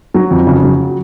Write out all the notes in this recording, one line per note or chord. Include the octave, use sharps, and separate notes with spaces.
F#3
F2
C#3
F#3